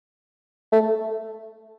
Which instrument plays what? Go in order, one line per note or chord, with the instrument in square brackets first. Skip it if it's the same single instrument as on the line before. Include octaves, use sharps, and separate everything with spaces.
[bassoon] A3